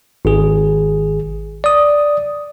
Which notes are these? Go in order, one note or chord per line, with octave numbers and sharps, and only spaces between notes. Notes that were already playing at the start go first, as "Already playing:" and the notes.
G#1 G#4
D5 D#6